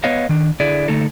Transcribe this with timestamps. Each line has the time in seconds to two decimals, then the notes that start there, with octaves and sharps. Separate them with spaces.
0.04 B3 B4 C#5 D#5 F5
0.29 D#3 D4
0.60 D3 E4 G#4 D5
0.88 D3 A3 D#4 A4